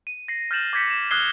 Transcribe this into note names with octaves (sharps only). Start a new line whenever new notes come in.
D#7
A#6 C7
F6 G6 A6 A#6 E7 F#7
D6 G6 G#6 A#6 B6 C#7
E7
D#6 F6 F#6 G#6 C7 G7